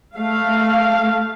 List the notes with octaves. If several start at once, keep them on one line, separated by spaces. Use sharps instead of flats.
A3 F5